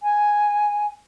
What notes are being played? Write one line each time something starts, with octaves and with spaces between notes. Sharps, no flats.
G#5